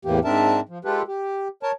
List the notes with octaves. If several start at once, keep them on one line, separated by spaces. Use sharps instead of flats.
E2 A2 E3 A#3 G4
G#2 C4 D4 A#4 E5 A5
F3
G#3 F4 G4 A4 B4
G4
A#4 C#5 A5